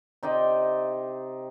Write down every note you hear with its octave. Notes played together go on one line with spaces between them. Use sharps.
C3 D#4 D5 G5